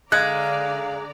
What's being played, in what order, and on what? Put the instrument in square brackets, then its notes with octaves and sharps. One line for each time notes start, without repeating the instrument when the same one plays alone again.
[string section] D3 D5 A#5 [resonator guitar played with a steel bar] G#3 [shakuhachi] F5 [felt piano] F#6 G#6